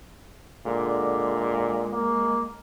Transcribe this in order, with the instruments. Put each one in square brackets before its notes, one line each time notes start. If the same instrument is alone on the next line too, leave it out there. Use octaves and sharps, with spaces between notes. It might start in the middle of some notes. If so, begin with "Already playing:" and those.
[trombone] A#2 [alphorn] D3 [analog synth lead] G#3
[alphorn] A#3